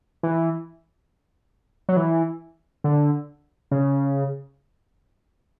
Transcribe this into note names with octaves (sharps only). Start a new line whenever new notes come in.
E3
F#3
E3
D3
C#3